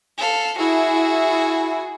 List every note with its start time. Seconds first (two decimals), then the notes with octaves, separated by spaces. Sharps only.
0.18 A4 F5
0.59 E4 F#4 G#4